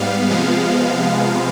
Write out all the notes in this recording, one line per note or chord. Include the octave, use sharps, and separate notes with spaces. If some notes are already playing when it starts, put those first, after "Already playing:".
Already playing: G#2 G3 B3 F5
C3 F3 G#3 B3